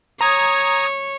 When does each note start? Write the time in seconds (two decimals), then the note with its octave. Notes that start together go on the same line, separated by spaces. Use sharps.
0.21 C#5 A#5 D#6 G#6